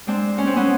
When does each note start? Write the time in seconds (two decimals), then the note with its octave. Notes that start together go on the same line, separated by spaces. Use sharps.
0.07 G#3 C4 D4
0.37 D#2 C#4
0.47 C4
0.56 B3 C#4